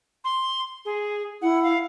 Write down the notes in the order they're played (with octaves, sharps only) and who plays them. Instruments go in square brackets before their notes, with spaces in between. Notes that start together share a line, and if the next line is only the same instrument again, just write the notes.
[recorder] C6
G#4
[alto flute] E4 [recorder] F#5
[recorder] F5